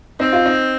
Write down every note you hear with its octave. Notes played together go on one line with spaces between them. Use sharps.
C4 D#4
F4
D#4